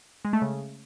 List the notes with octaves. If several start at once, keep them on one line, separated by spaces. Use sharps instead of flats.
G#3
A3
C#3